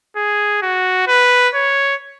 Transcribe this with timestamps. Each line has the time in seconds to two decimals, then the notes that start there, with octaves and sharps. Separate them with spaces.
0.16 G#4
0.62 F#4
1.08 B4
1.54 C#5